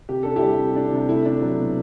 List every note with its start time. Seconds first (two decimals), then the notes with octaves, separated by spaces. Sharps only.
0.09 C3 G4
0.23 D4 A4
0.36 E4 G4
0.42 G3
0.59 C3
0.76 D4
0.93 C3
1.09 A3 E4
1.25 D4
1.42 F#3
1.59 B2